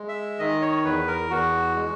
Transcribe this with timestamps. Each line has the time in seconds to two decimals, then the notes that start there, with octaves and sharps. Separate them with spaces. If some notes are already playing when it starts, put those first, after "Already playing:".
Already playing: G#3
0.09 E5
0.39 D#3 D#5
0.62 C#5
0.85 E2 B4
1.08 A#4
1.30 E2 F#4
1.76 G#3